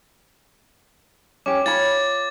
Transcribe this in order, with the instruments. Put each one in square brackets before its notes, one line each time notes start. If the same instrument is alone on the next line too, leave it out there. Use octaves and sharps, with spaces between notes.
[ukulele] C#4 G4 [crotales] D6
[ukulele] F4 C#5 B5 [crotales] A6